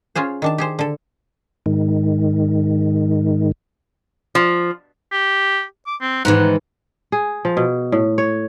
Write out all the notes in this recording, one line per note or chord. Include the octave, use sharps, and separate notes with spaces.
C#4 F4 G#4 C5
D#3 D4 A5
G4 G#4 C5
D3 A4
G#2 D#3
F3
G4
D6
C4
G#2 D#3 E3 F#5
G#4
F3
B2
A2
C#5